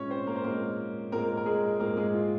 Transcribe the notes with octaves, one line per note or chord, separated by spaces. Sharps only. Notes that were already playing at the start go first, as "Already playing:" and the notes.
Already playing: A#2 G#3 C#4 C#5
C4 C5
A#3 A#4
C5
A#2 G#3 A#3 C4 A#4
A#2 G#3 A#3 C4 A#4
A#4
G#3 G#4
A#2 G#3 A#3 C4 A#4
G#3 G#4
F4